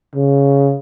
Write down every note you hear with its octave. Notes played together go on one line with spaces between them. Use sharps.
C#3